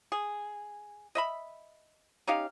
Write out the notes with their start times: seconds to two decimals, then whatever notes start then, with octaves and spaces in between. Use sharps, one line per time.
0.12 G#4
1.15 D#5 E5 B5
2.27 C#4 D#4 G4 F5